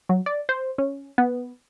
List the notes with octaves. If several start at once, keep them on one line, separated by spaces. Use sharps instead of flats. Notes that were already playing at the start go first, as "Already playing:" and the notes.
F#3
D5
C5
C#4
B3